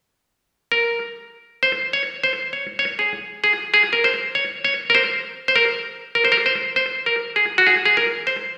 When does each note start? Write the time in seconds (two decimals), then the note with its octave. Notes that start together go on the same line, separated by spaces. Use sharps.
0.72 A#4
1.63 C5
1.93 C#5
2.24 C5
2.53 C#5
2.79 C#5
2.99 G#4
3.44 G#4
3.74 G#4
3.93 A#4
4.04 C5
4.35 C#5
4.65 C#5
4.90 A#4
4.95 C5
5.48 C5
5.56 A#4
6.15 A#4
6.25 C5
6.32 A#4
6.46 C5
6.76 C5
7.06 A#4
7.36 G#4
7.58 F#4
7.66 G#4
7.86 G#4
7.97 A#4
8.27 C5